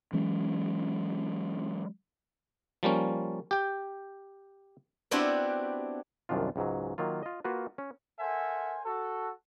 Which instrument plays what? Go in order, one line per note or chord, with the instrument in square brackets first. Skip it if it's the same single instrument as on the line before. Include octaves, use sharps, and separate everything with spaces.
[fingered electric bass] E3 F#3 G#3 C#4
[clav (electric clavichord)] F3 G3 A#3 C#4
G4 G5
[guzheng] B3 C4 D4 E4 F#4 G4
[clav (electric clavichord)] C2 F#2 D#3 D4 F4
C#2 G#2 F#3
D#3 F#3 A#3 F4
F4 D#5
A#3 F4 F#4 B4
C#4
[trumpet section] A4 A#4 C5 E5 F#5 G#5
F#4 A4